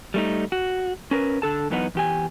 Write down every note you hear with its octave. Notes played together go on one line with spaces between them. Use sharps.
G3 A3 D#4
F#4
C#4 A#4 B4
D3 A4 A5
F#2 E3 B3 D#4 B4 F#5
E2 G4 G#5